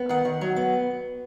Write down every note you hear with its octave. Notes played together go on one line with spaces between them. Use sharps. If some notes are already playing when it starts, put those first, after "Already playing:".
Already playing: B3
D#3 F#5
D#3
F#3
B3